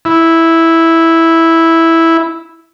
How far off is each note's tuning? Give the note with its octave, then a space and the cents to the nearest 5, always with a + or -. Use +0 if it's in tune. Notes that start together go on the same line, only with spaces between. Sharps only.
E4 -5